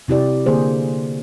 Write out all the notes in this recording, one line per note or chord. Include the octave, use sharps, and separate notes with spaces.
C3 E4 G4 D5
D3 A#3 G#4 C5